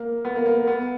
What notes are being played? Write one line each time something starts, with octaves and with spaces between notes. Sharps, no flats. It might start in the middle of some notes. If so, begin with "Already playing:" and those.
Already playing: A#3
B3
A#3
A#3
A#3
B3